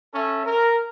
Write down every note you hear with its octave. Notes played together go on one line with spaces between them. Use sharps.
C#4 A4 E5
A#4